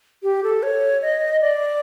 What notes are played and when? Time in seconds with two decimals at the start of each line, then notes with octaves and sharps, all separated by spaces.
0.23 G4
0.43 A4
0.63 C#5
1.02 D#5
1.41 D5